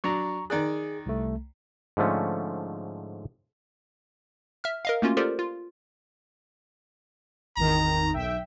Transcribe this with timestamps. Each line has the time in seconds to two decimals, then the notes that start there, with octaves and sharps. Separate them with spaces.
0.04 F#3 D4 A#5 C#6
0.50 D#3 G#4 D5 F#6
1.06 C2 A3
1.97 G#2 D3 F3 A3 C#4
4.64 E5 F6
4.85 A#4 D#5 F5
5.02 A3 A#3 C#4 F4 F#4
5.17 F4 G4 A4 A#4 C5 D5
5.39 F4
7.57 G#1 E2 D#3 A#5
8.14 B1 E5 G5